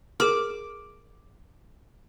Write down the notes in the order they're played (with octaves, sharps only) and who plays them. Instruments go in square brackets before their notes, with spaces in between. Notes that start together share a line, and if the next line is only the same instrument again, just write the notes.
[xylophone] G#4 A#4 F6 [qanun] D6